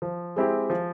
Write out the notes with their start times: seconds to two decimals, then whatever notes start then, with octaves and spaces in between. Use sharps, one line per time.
0.02 F3
0.36 G#3 C4 E4 G4
0.70 F3